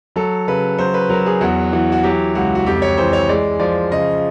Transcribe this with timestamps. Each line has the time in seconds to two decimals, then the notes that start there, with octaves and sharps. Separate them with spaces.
0.16 F#3 A4
0.47 C#3 B4
0.78 F#3 C5
0.94 B4
1.09 F#3 A#4
1.26 G#4
1.41 E2 F#4
1.73 E3 F#4
1.92 F#4
2.03 F#3 G4
2.35 C#2 F#4
2.55 F#4
2.66 F2 G4
2.82 C#5
2.97 E3 C5
3.13 C#5
3.29 G#3 D5
3.59 F3 D5
3.91 C#3 D#5